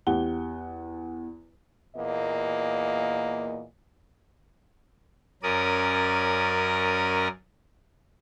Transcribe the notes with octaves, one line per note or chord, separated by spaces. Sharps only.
E2 G4 F#5 G7
E2 A#2 A#3 D#5
F#2 C#4 A#4 D5 D#6